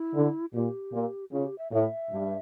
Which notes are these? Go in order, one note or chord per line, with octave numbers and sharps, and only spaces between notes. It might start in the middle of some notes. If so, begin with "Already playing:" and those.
Already playing: E4
D3
A#2 G4
A#2
C#3 F4
G4
E5
A2 E5 F5
G2